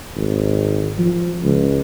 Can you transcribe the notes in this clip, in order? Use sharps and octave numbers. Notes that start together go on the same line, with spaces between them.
G#1
F3
C#2